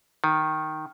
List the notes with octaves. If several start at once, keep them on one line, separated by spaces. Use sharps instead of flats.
D#3